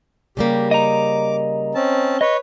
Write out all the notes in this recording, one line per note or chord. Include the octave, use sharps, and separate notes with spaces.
C#3 G3 A#3 G4
D#5 A#5 D6
C4 C#4 A5
B4 C#5 D#5